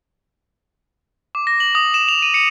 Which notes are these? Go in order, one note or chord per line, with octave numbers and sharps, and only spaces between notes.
D6
A#6
F#7
D#6
E7
F7
D#7
C#7